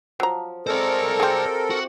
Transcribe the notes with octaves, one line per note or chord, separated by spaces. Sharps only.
F3 F#3 A#5
G#3 C4 A4 A#4 C5 D5
C4 G4 G#4
F#4